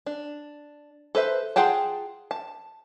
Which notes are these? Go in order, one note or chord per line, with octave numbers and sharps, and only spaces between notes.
D4
A4 B4 C5 E5
F4 G#4 F#5 G5 A5
A5